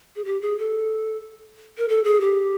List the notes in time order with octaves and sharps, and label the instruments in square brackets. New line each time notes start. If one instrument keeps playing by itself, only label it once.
[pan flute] G#4
G4
G#4
A4
A#4
A4
G#4
G4